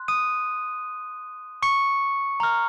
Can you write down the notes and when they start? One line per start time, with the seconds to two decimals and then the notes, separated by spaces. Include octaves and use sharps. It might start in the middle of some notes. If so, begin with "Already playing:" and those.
Already playing: C6 F#6
0.08 D#6 D#7
1.62 C#6 C#7
2.40 A#5 F6